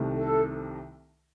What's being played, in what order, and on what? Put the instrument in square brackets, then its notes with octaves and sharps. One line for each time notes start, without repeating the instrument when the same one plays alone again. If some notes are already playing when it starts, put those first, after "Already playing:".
Already playing: [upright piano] C2 C3 D#3 A3
[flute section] A4